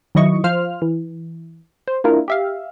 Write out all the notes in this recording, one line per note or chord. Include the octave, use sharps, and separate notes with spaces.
D#3 F#3 E4 D#5 C#6
F3 C5 F5 F6
E3
C5
A#3 D4 E4 F4 A#4
G4 E5 F5